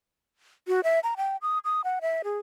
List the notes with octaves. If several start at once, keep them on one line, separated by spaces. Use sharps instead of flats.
F#4
E5
A#5
G5
D#6
D#6
F#5
E5
G#4